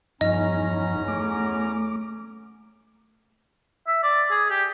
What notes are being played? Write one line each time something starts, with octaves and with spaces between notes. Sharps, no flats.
E2 G2 F3 C#4 D#4 D#5 A#5
A3 D6
E5
D5
G#4
G4